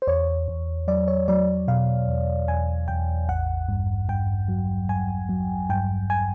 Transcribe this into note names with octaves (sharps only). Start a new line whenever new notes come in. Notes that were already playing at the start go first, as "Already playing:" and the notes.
C5
E2 C#5
E2
F#3 D5
C#5
F#3 D5
B2 F5
E2
E2 G#5
E2 G5
A1 F#5
G2
G2 G5
F#3
G2 G#5
F#3
G2 G5
G#5